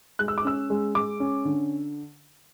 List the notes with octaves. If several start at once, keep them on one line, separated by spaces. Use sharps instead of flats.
G#3 F#6
E6
D6
C#4 E6
G#3
G#3 D6
C#4
D3